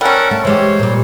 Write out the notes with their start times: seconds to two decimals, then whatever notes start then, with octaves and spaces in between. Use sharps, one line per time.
0.01 G3 C#4 A4 A#4 F#5
0.31 A3 A5
0.45 E3 G#3 G4 C5 C#5
0.79 A#2 G3